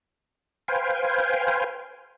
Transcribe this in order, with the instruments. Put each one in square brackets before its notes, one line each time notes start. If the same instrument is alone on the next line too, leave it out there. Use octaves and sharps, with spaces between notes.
[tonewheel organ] B4 C5 F5 G5 G#5